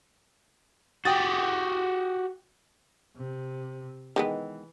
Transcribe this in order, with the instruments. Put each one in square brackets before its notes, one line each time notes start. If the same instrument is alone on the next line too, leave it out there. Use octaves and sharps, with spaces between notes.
[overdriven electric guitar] F#4 G4 [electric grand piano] G5 D#6 A6
[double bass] C3
[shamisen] D#3 G#3 B3 [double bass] E3